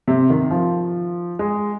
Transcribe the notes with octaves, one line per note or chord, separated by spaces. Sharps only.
C3
D#3
F3
G#3